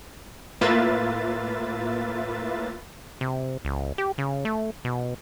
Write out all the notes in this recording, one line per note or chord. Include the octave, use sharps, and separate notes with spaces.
A2 A#3 F4 B4 E5 A6
C3
C#2
G4
C#3
A3
B2